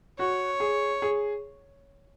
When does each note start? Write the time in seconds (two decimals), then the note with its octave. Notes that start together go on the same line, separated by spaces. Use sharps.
0.19 F#4 C#5
0.60 G#4
1.02 G#4